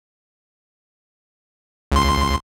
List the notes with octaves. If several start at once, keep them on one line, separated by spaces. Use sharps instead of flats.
C#2 C6